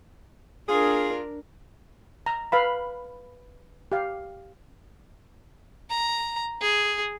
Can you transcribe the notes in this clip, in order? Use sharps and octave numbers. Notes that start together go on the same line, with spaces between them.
D4 F4 G#4 A#4
A#5
B4 F5 B5
G4 F5
A#5
G#4